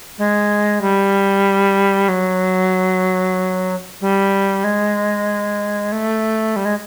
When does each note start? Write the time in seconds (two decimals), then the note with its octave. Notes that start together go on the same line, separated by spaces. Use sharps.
0.18 G#3
0.81 G3
2.08 F#3
4.01 G3
4.64 G#3
5.92 A3
6.56 G3
6.65 G#3